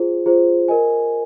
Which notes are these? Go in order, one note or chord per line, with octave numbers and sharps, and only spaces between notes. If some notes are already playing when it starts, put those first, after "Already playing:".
Already playing: F4 G#4 C5
F4 G#4 C5
A#4 D#5 G#5